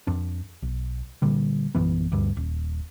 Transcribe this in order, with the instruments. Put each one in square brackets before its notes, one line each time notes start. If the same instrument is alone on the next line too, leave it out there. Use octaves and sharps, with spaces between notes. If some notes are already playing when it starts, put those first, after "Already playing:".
[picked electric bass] F2 D4
B1
A#2 D3 G3
A#1 F#2 E3 B3
D2 G2
D#1